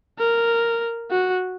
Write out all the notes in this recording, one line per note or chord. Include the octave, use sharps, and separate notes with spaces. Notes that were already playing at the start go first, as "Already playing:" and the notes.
A#4
F#4